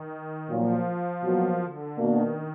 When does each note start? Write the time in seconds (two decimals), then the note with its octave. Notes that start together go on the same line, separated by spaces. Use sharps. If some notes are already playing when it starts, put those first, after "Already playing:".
Already playing: D#3
0.50 A#2 F3 F#3 A#3
1.23 B2 F#3 A#3
1.60 D3
1.96 B2 D#3 A#3 D4